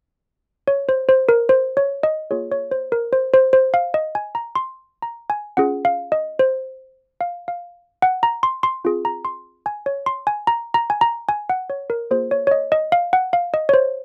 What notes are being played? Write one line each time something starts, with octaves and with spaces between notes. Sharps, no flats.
C#5
C5
C5
A#4
C5
C#5
D#5
A#3 F4 G#4 C#5
C#5
C5
A#4
C5
C5
C5
F5
D#5
G#5
A#5
C6
A#5
G#5
C#4 F4 G#4 F#5
F5
D#5
C5
F5
F5
F#5
A#5
C6
C6
C4 F4 G#4
A#5
C6
G#5
C#5
C6
G#5
A#5
A#5
G#5
A#5
G#5
F#5
C#5
A#4
A#3 F4 G#4 C5
C#5
C#5
D#5
D#5
F5
F#5
F5
D#5
C#5
C5